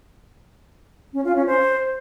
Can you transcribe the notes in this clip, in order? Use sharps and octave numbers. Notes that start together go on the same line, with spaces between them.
C#4
F4
C#4
C5